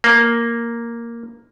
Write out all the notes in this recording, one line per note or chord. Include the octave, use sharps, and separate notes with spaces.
A#3